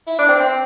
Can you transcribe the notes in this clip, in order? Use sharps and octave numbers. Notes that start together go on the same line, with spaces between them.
E4
D4
C4
C4